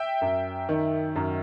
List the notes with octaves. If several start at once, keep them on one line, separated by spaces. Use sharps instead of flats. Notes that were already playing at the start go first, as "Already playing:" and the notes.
Already playing: E5 G5
F#2
D#3
F#2